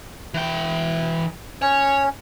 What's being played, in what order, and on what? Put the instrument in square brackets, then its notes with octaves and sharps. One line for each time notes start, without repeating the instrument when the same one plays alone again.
[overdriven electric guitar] E3 G5
[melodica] C#4 [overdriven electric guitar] C#5